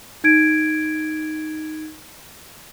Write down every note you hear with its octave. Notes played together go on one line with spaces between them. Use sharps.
D#4 G#6 D7